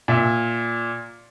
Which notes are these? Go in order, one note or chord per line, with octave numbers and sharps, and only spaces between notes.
A#2 E5